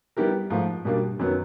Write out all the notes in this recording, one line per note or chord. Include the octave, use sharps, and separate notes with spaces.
G3 B3 E4 G4 A#4
G#2 F3 A3
B2 G3 A#3 D4
F#2 D#3 F#3 B3